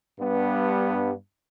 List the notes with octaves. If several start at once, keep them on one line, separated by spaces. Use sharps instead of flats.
G2 B3